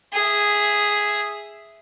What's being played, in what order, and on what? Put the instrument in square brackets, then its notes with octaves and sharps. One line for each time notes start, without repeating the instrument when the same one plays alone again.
[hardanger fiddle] G#4 E5